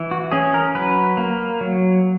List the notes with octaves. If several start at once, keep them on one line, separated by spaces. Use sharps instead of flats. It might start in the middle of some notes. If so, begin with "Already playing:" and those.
Already playing: E3
F#4
C#4 G#4
A#4
F#3 B4
A#3
F#3